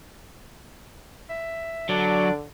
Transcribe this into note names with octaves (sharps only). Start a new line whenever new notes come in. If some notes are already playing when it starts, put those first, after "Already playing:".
E5
D3 F#3 D4 D5